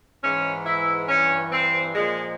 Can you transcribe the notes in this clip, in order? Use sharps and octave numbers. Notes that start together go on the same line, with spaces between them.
G#2 E3 C#4
E4
G2 E3 C#4
C4
A#2 F3 G#3